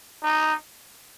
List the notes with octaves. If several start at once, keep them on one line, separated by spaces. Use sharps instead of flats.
D#4